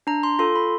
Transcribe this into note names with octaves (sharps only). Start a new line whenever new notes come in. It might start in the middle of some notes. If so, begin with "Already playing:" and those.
D4 A#5
C6
F4 A4 C6
B5